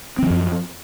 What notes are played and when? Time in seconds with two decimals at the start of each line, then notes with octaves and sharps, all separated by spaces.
0.18 C4
0.22 E3
0.26 F3
0.30 F#2